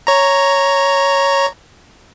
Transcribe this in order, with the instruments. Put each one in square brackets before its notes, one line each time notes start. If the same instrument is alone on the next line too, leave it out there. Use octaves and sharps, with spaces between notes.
[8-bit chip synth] C#5 A#5